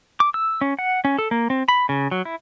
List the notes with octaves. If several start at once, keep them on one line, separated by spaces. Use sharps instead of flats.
D6
E6
C#4
F#5
C#4
A4
A#3
C4
B5
C#3
F#3
E4